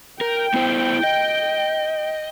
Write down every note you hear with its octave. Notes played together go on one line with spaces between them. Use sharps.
A#4 G5
B3 E4 C5
D#5